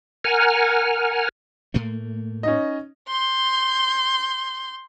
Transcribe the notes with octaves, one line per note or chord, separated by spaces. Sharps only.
A#4 F#5 G#5 F6
A2 A3 A#3
C#4 D#4 D#5
C6 G6